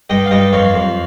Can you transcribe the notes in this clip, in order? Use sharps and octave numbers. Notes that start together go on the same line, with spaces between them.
G2 D#5 G5
F5
G2 D#5 G5
F2 C#5 F5
F2